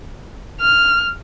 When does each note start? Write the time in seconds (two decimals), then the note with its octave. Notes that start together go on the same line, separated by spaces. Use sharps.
0.61 F6